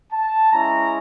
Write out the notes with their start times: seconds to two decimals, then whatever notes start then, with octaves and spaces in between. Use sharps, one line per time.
0.13 A5
0.52 G#3 C#4 E4 A#5